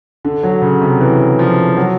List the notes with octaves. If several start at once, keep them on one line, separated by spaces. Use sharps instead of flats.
D3
F#3
C#3
C3
E3
F3
F#3